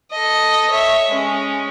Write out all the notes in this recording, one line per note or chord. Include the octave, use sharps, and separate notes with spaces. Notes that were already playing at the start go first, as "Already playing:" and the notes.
A4 D#5
C#5 E5
G#3 C#4